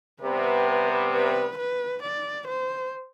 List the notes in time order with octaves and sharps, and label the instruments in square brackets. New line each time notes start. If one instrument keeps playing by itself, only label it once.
[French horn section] C3 G3 B3 [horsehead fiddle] B4
[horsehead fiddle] B4
B4
D5
C5